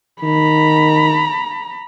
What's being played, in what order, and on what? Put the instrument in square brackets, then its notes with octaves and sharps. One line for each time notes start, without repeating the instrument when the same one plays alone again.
[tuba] D#3 [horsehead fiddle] A#5 B5